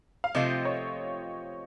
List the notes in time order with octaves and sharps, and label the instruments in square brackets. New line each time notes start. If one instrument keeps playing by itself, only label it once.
[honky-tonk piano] F5
[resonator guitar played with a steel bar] C3 F3 A3 C4 F4 [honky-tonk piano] D#5
[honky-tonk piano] C#5